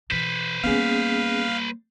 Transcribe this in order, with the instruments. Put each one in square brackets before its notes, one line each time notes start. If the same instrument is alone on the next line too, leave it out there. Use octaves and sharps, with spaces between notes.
[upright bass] B2 E3 [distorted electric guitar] B4 C5
[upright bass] G3 A#3 [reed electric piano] B3 C#4 G#4 [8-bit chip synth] F5